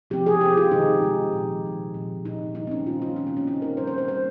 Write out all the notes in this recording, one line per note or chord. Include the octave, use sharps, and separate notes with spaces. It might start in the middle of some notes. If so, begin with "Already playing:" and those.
C3 F3 C4 G4
G#4
C3 F3 C4 G4
F4
C3 D#3 G#3 D#4
C3 D#3 G#3
A#2 F3 C4
A#2 F3 C4
A#2 F3 C4
A#2 F3 C4 D#4
D#3 G3 A#3 D#4
C4
C#4
D#3 G3 A#3 F4
F4
D#3 A#3 C#4
C4
C#4
D#3 A#3 D#4
A#4
C3 G3 A#3 C5
C5
C5
C3 G3 A#3 C5